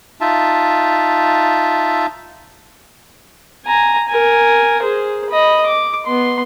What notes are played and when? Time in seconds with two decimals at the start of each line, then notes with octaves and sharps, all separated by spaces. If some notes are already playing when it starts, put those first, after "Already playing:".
0.21 D#4 F4 E5 A5
3.66 G#5 A#5
4.08 A#4 G#5
4.82 G#4 C5
5.30 D#5 B5
5.66 D6
6.06 B3 C6